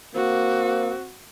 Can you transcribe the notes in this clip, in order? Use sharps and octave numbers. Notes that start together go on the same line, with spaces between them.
A#3 C4 F#4